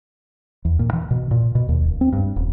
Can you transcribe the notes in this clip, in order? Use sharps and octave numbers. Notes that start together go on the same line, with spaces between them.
E2
A#2
E3
B2
A#2
B2
D#2
D1
C4
G2
D#1